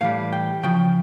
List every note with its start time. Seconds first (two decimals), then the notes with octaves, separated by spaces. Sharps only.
0.01 A2 E3 G3 F5
0.33 G5
0.63 C#3 F3 G5